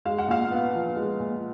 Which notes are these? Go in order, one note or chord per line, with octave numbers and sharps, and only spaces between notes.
G#3 F5
F#5
A#2 F5
B3
F3
G#3
A#2